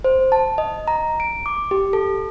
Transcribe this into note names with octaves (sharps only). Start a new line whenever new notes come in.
C5
A5
D#5
A#5
D7
D6
G4
A4